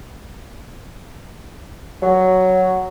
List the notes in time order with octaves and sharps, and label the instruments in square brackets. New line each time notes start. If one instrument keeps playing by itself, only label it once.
[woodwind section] F#3